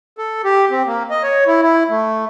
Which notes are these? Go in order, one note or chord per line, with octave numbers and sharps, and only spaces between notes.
A4
G4
C4
A#3
D#5
C#5
E4
E4
A3